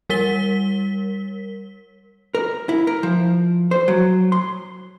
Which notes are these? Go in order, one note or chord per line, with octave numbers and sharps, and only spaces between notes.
G3 A#4 B6 G7
A#4
E4
A#4
F3
C5
F#3
C6